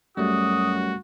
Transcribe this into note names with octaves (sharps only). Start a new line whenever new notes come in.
F#2 G3 A3 F#4 D#6